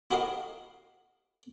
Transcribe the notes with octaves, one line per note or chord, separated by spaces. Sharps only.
E4 F#4 G4 A#4 D#5 F5